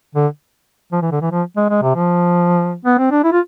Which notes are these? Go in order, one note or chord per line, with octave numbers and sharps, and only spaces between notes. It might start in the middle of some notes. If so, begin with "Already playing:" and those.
D3
F3
E3
D3
E3
F3
G#3
G#3
C3
F3
B3
C4
D4
E4
F4